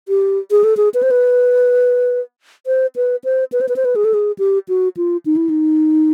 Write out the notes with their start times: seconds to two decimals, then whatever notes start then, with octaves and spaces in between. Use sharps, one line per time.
0.08 G4
0.51 G#4
0.64 A4
0.77 G#4
0.94 B4
1.03 C5
1.11 B4
2.67 C5
2.96 B4
3.24 C5
3.52 B4
3.61 C5
3.69 B4
3.76 C5
3.85 B4
3.96 G#4
4.05 A4
4.14 G#4
4.39 G4
4.69 F#4
4.97 F4
5.26 D#4
5.36 E4
5.49 D#4